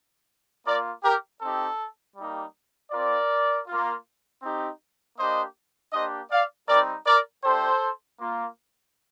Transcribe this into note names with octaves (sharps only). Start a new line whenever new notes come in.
A#3 F4 A#4 D5
G4 A#4
C4 D#4 G4 A4
G3 A#3 D#4 G4
C4 F4 A#4 D5
A#3 F4
C4 D#4 G4
A#3 D4 G4 C5 D#5
A#3 D4 G4 C5 D#5
D5 F5
G3 C4 D#4 A#4 D5
A#4 D5
A3 D4 G4 A4 C5
A#3 F4